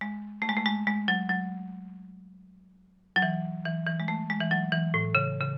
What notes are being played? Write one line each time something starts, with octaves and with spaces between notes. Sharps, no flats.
G#3
A3
G#3
A3
G#3
G#3
F#3
F#3
F#3
E3
E3
E3
G#3
A3
G#3
E3
F#3
E3
A2
C#3
C#3